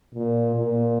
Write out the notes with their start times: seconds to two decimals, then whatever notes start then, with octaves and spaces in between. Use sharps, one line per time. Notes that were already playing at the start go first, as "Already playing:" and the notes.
0.15 A#2
0.56 A#2